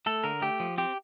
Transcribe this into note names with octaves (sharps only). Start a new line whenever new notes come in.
A3 A4
D3 A#4
A3 G4
F3
C4 G4